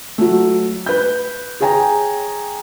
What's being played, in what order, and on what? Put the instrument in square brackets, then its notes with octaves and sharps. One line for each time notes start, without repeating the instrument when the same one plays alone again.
[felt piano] F#3 A3
B4 G6
G#4 C#5 G5 G#5 A#5